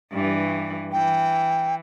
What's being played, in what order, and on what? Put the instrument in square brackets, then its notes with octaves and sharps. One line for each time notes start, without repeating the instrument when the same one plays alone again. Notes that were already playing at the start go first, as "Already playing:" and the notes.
[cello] G2 E3
[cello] E3 [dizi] G5